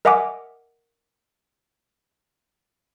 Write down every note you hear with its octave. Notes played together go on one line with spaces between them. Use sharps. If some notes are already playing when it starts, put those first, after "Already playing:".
A#4 D#5 E5 F#5 G#5 D6